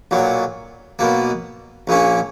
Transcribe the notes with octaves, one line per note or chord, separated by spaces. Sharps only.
B1 A#2 F#3
B1 B2 A#3
A#1 A#2 A#3 C#4